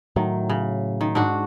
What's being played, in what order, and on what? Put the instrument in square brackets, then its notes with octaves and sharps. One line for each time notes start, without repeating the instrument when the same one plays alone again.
[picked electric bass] A2 F#3 [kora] D#3
[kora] C#3
D#3
G#2 D4 F#4